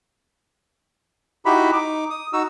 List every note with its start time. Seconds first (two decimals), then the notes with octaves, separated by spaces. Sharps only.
1.45 D#4 E4 F#4 G4 B5
1.73 D#4 D6
2.10 D#6
2.33 D#4 F#4 E6